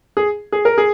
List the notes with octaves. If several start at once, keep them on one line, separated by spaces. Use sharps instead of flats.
G#4
G#4
A#4
G#4